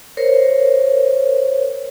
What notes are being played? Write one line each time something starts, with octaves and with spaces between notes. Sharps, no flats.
A#4 C5 C#5